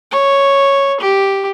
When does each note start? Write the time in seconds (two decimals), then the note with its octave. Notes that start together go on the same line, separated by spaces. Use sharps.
0.11 C#5
1.00 G4